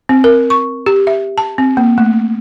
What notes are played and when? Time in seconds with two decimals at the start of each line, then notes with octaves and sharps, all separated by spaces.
0.09 C4
0.24 A#4
0.50 C#6
0.86 G4
1.07 E5
1.38 A5
1.58 C4
1.77 A#3
1.98 A3